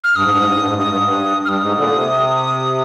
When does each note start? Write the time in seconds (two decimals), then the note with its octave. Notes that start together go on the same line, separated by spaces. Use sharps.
0.04 F6
0.16 G2 D#6
0.23 G#2
0.30 G2
0.38 G#2
0.45 G2
0.52 G#2
0.60 G2
0.67 G#2
0.75 G2
0.80 G#2 D#6
0.89 G2
0.97 G#2
1.04 G2
1.45 G2 D#6 F6
1.61 G#2
1.78 A#2 D3
1.88 D3
1.94 C3